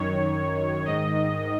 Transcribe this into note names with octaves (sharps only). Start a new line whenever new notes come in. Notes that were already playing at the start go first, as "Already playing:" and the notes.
Already playing: F#2 D#3 C#5
G#2 D#3 D#5